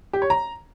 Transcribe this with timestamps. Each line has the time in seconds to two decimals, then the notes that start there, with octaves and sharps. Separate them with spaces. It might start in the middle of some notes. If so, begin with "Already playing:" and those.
0.13 G4
0.22 C#5
0.30 A#5